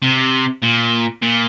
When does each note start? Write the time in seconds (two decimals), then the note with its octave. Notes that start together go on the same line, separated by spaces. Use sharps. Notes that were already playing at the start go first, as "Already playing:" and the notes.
0.02 C3
0.63 A#2
1.22 A#2